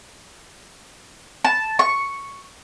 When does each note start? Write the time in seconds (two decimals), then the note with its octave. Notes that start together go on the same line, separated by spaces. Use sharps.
1.45 A5
1.79 C#6